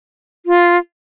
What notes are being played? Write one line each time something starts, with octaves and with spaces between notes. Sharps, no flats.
F4